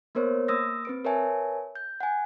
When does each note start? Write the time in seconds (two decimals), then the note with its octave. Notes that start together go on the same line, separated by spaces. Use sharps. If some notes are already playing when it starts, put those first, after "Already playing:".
0.15 A#3 B3 A#4 C5 C#5
0.48 A#3 D#6 E6 A#6
0.85 C4 B4 D7
1.05 A#4 B4 C#5 E5 G#5 A5
1.75 G6
2.01 F#5 G#5